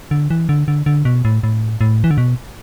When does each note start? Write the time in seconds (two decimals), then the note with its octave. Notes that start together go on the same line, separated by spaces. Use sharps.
0.11 D3
0.30 E3
0.49 D3
0.68 D3
0.86 D3
1.05 B2
1.25 A2
1.43 A2
1.81 A2
2.04 E3
2.11 D3
2.18 B2